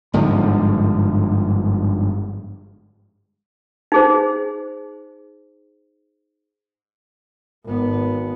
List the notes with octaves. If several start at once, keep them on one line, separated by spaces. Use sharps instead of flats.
G1 G#2 D3 F3
D#4 G#4 C5
G#1 B3